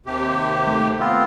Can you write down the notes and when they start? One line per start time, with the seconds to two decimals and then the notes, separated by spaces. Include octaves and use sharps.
0.06 D#2 C3 G4
0.67 A3
1.00 B3 C4 F4